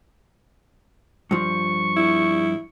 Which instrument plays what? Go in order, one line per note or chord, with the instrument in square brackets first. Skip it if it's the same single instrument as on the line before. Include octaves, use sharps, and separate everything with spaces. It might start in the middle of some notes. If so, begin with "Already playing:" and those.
[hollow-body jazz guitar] G2 F3 [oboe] C#6
[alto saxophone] E4